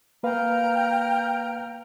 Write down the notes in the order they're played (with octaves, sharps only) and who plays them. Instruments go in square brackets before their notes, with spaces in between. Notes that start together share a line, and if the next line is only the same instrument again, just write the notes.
[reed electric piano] A#3 B4 F5 [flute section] G5 A#5 F6